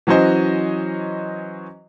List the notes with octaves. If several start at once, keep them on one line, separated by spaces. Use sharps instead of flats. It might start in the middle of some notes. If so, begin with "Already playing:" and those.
E3 F#3 C#4 F#4 C5 D#5